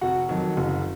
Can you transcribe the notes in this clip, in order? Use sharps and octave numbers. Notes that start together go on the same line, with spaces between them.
F1 F#4 F#5
F2 D#3 F#3
F#1